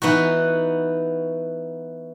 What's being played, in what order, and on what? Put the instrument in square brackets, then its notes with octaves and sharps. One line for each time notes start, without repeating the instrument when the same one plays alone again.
[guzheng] E3 B3 D#4 F#4